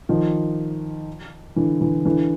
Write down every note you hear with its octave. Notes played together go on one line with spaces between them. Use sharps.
D#3 F3
D3 E3
D3 E3
D3 E3